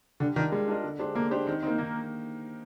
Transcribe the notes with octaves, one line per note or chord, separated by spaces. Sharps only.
D3 G3
D#3 D4 F4 A#4 D#5
G3 G#3
D4 F4 A#4 D#5
D3
G#3 D4 G4 C5
D3 A#3
G#3 D4 G4 C5
D#3 C4
A#3 C4 D#4
D#3 A#3